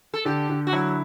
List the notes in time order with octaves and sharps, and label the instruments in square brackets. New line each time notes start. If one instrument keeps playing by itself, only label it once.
[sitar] A4
[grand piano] D3 [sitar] G4
[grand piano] D3
[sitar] F#4
[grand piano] F#3 [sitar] E4